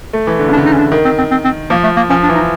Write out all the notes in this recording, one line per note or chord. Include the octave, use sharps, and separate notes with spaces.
A3
E3
D3
C#3
D4
D3
D#4
C#4
D4
D#3
C4
C4
C4
C4
F3 A#3
A3
A#3
F3 C#4
D4
E3
D#4